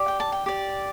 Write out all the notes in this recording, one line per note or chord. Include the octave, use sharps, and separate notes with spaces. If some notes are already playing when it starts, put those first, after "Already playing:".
Already playing: G4 D5
G5
A5
G5
G4 D5